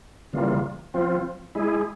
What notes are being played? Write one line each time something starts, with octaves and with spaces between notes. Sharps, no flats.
C#3 E3 G3 A#3 F4
F3 C4 F4
G#3 E4 G#4